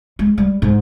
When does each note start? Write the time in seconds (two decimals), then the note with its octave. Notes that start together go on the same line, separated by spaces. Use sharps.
0.19 G#3
0.38 G3
0.62 G#2